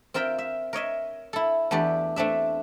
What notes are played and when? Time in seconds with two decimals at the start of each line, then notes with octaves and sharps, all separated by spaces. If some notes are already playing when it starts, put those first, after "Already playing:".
0.14 C4 F4 A#4 E5 G5
0.38 E5
0.73 A#4 C#5 D#5 E5
1.33 E4 A4
1.71 E2 A3 D4 G4 D5
2.16 A3 C4 D4 E5